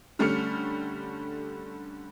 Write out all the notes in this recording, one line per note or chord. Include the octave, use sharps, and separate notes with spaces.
D3 G3 A3 C#4 F6 C#7